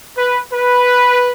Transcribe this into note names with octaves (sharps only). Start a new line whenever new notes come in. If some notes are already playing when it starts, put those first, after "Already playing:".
B4
B4